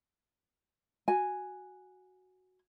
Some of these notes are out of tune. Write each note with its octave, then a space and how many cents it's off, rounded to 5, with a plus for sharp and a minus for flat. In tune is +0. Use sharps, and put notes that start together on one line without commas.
F#4 +0 G#5 +0